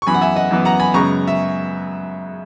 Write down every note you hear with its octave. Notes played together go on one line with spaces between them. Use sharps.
C#6
F#2 E3 B3 G#5 B5
F#5
E5 G#5
D#5 F#5
F#2 E3 B3
F#5 A#5
G#5 B5
F#2 C#3 G#3 B3 A#5 C#6
E5